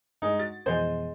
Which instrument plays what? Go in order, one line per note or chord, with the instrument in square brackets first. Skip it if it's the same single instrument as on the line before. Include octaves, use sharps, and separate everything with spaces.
[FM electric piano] G2 [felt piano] G#3 D#4
[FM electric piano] F#4 [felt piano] A6
[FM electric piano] F2 B2 E3 [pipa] G#3 C5